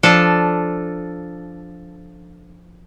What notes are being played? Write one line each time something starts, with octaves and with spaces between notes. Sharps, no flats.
F3 D4 A4